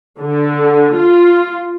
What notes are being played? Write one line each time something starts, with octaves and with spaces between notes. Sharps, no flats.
D3
F4